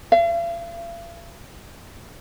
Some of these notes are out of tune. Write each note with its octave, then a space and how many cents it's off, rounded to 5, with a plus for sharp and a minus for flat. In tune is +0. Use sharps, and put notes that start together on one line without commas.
F5 -45